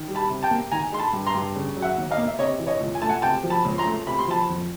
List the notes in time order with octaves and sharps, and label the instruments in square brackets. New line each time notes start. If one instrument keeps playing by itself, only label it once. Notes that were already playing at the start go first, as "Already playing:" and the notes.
Already playing: [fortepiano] D#3
G3
A5 B5
C3
G5 A5
A#3
D#3 G#5 A#5
G#3 C6
A5 B5
G2
A#5 C6
G2
C#3
F#3
E5 F#5
D#2
D#5 F5
A#3
E5
C3 C#5 D#5
E3
C#5 D#5
C#2
G#5
A3 A5
F#5 G#5
C3 G5 A5
F3
A5 B5
C#2
A#5 C6
A3
C3 B5
C6
F3 A5 B5
F2